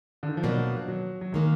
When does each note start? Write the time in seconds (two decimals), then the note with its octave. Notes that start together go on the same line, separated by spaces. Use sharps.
0.23 D3
0.29 D#3
0.37 F3
0.43 B2 F#3 A#3 D4
0.88 F#3
1.21 F#3
1.32 D#3 G#3 A#3